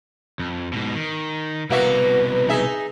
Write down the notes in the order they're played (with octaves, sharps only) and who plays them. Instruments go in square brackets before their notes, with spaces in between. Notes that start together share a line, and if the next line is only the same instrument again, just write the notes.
[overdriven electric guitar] F2
G#2 B2
D#3
[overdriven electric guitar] C2 B2 [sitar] A#3 F#4 E5 [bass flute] B4
[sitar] D#4 G#4 E5